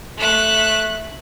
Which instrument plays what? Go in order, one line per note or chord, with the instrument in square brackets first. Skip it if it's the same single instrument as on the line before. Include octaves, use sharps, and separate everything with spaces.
[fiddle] A3 F#6